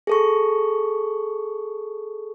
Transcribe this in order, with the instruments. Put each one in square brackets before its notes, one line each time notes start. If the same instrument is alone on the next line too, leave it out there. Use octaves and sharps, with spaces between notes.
[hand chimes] G#4 A4 C#6